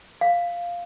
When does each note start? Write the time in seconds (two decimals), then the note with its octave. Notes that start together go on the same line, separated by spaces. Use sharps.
0.21 F5